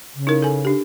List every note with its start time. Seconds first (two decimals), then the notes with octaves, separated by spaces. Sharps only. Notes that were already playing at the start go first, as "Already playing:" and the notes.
0.15 C#3
0.27 D#4 E4 A#4
0.42 A4 G#5
0.65 D4 G4